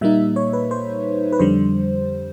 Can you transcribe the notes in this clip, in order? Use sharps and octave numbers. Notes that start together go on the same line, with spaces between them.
A#2 G3 A#3 D#4 E5
C#5
B4
C5
B4
F2 D3 G3 C5